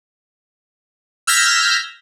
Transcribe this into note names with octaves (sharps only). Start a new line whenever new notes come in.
E6 F6 G6 G#6 A#6 B6